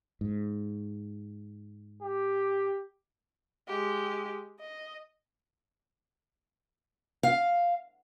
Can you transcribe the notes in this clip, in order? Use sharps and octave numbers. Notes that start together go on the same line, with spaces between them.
G#2
G4
G#3 G4
D#5
F5